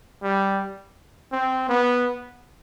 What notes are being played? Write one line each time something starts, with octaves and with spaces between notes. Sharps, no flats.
G3
C4
B3